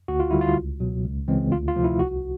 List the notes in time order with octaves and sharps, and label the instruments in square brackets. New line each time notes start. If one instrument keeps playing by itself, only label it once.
[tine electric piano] D2 F#4
F4
D3 G3 E4
F4
C#2
B2 F#3
C#2
C#3 E3 G#3 C4
D2 F4
F4
C3 F3 A3
E4
C2 F#4